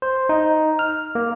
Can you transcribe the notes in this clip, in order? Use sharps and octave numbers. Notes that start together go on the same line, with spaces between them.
C5
D#4
F6
A#3